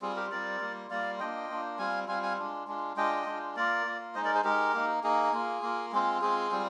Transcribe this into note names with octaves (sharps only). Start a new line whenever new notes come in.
G3 C4 F4 G#4
G4 A#4
G3 C4 F4 A#4 D5
G3 A#3 F4
G3 A#3 F4 D5 F5
A#3 D4 F4 D#5 G5
A#3 D4 F4
G3 C4 F4 F5 G#5
G3 C4 F4 F5 G#5
F5 G#5
G#3 D4 F4
G#3 D4 F4
G#3 D4 F4 D#5 G5
G#3 D4 F4
A#3 F4 A#4 D5
A#3 F4
G#3 D#4 C5 D#5
A#4 D5
G#4 C5
G#3 D#4 G4 A#4
A#3 D#4
A#3 D#4 G#4
A#3 F4
A#3 F4
G#3 C4 F4
G#3 C4 F4 G#4
G3 C4 F4